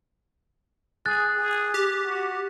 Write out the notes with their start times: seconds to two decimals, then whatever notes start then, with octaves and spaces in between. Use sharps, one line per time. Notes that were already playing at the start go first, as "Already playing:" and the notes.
1.06 G#4 F#6 A6
1.36 G#4
1.74 G4
2.04 F#4